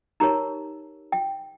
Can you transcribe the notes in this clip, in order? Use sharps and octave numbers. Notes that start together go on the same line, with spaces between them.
D#4 G4 A#4 C#5 A#5
G5